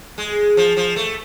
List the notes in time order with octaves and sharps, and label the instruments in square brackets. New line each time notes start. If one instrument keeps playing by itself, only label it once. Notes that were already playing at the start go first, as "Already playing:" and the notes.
[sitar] G#3
F3
F3
A3